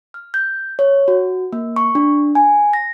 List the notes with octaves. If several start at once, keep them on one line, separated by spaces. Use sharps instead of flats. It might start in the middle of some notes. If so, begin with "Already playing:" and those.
F6
G6
C#5
F#4
A#3
C#6
D4
G#5
A#6